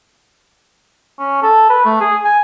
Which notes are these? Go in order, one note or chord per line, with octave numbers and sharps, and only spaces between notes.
C#4
A4
B4
A3
G#4
G#5